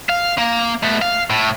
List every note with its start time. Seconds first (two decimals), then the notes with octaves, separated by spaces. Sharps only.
0.09 F5
0.38 A#3
0.83 A3 B3
1.02 F5
1.30 A2